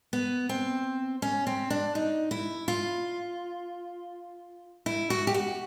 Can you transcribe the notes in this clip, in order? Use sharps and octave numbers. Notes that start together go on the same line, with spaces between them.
B3
C4
C#4
C4
D4
D#4
E4
F4
E4
F#4
G4
F#4